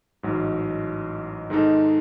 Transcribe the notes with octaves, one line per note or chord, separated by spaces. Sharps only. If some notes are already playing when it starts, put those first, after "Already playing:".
A1 G#2 F#3
G#2 D#3 G#3 D#4 A4